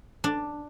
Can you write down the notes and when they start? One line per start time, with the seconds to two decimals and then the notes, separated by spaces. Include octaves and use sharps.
0.24 D4